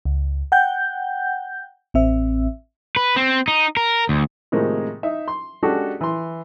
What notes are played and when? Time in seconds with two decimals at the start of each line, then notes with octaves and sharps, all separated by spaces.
0.05 C#2
0.52 F#5 G5 G6
1.94 A1 C4 E5
2.96 B4
3.16 C4
3.48 D#4
3.77 A#4
4.09 D2
4.52 A2 C3 D#3 F3 G#3 A#3
5.03 D#4 E5
5.28 C6
5.63 G#3 C#4 D4 F#4 G4 A4
6.01 E3 C6